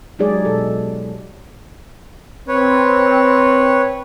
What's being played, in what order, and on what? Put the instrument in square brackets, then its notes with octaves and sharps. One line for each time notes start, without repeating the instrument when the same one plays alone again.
[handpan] F#3 G#3 D#4 G4 G#4 D5
B2 A4
[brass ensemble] C4 [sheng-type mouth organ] B4 C#5